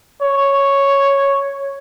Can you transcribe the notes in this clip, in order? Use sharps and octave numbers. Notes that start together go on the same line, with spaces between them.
C#5